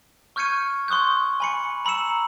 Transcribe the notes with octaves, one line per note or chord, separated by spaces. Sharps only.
C#6 F6 G6 G#6 C#7 D#7
C6 C#6 D#6 F#6 G6
G#5 B5 C#7
A#5 B5 E6 C#7 E7